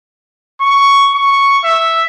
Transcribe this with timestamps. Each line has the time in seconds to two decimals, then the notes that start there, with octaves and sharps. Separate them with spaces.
0.61 C#6
1.15 C#6
1.64 E5